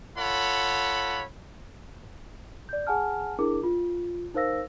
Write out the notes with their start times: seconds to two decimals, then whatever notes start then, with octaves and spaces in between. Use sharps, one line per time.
0.17 F4 A4 C#5 F#5 B5
2.69 D5 G6
2.87 G#4 F#5 G#5 A5 F6
3.39 D4 E4 G#4 A#4 D6
3.63 F4
4.34 D#4 A#4 C5 F5 E6 A#6